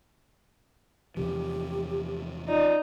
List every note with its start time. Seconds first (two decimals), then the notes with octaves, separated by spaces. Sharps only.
1.17 E2 C3 F3 G4
2.48 D#4 F4 D5